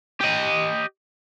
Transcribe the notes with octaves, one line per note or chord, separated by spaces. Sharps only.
G4 D#5